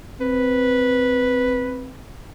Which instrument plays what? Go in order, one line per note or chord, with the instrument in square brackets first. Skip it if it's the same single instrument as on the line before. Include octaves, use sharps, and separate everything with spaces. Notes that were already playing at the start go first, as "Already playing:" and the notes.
[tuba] C4 [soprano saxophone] B4